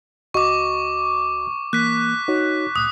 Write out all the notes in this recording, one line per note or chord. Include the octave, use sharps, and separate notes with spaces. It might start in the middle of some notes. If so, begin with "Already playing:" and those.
C#2 F#4 D#5 C#6 D6
E3 A#3 F#6 B6
D#4 F#4 C#5
C2 A2 D#6 F#6